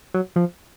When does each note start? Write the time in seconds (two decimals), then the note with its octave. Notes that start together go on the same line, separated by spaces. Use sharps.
0.14 F#3
0.36 F3